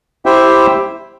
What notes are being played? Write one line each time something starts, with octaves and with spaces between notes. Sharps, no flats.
E4 G4 C5 E5 G5